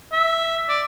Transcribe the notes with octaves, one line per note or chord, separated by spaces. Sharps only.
E5
D5